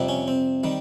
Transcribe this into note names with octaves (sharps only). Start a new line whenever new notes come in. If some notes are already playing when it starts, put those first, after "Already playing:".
Already playing: F2 C3 G3
C#4
C4
D#3 G3